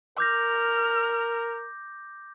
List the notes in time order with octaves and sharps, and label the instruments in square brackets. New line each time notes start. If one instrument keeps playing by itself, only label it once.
[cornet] A#4 [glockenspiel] D6 G6 A#6 [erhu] F6